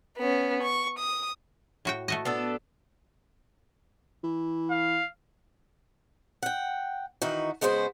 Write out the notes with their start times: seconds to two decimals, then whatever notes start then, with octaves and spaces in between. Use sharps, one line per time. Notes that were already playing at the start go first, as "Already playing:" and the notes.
0.18 B3 C#4
0.63 C#6
0.99 D#6
1.85 A2 F#4 G5
2.08 A3 F#4 D#5
2.25 B3 D4 A4
4.24 E3
4.71 F5
6.43 F#5 G5
7.22 D#3 E3 D#4 F#4
7.61 C#3 G#3 B3 F#4 C5